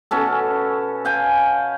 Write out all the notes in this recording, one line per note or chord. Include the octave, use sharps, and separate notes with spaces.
B2 C#4 A4
F5 G5 G#5